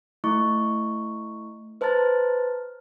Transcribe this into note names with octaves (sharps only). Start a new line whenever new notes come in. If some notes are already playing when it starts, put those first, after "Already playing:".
A3 E4 C#6
B4 C5 A5 A#5 F6 A6